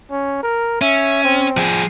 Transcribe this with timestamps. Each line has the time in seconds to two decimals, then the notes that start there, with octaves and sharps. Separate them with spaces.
0.11 C#4
0.43 A#4
0.81 C#4 E5
1.24 C4
1.57 F3 G#4